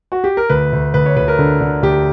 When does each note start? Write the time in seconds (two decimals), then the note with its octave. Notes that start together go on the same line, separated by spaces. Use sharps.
0.12 F#4
0.24 G4
0.37 A#4
0.50 D2 B4
0.73 D2
0.94 D2 B4
1.06 C#5
1.17 D2 B4
1.28 A#4
1.38 D3
1.61 D3
1.83 D2 G4